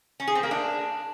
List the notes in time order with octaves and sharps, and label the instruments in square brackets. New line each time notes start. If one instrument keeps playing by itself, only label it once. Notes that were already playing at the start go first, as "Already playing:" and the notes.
[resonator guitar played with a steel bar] C#4
G#4
C4
A#3
D4